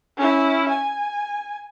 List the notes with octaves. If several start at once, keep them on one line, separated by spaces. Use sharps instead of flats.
C#4 E4
G#5